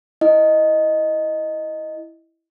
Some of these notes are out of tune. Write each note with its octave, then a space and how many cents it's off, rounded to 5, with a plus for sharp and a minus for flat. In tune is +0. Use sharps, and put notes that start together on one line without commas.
E4 +0 D#5 +0